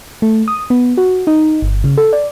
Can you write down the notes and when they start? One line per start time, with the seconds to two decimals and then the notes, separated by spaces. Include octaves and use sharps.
0.22 A3
0.48 D#6
0.70 B3
0.97 F#4
1.27 D#4
1.62 G1
1.84 C#3
1.97 A4
2.13 D5